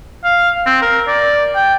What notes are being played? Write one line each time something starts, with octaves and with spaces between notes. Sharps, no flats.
F5
C4
A#4
D5
G5